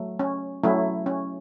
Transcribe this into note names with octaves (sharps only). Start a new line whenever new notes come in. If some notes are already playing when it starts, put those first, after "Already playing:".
Already playing: F#3 A3
C#4
F#3 A3 C#4 E4
C#4